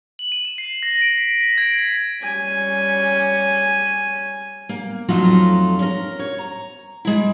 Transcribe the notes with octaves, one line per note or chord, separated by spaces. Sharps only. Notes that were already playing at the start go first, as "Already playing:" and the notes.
F#7
D#7
E7
C7
A#6
D7
B6
B6
G#6
D7
G3 C#4 G#5
A#3
F2 F#3 A3 D#4 F4 A5
C#4 A#4
C#5
A#5
G#3 E4